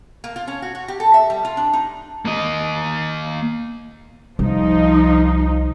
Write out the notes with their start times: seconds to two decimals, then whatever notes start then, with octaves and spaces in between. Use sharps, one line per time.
0.24 A#3
0.36 F4
0.47 C#4
0.62 F#4
0.75 F#4
0.88 G4
1.00 A4
1.14 E5
1.30 G3
1.45 F4
1.57 D4
1.73 D#4
2.25 A#3 D#5
4.39 C2 F3 D#4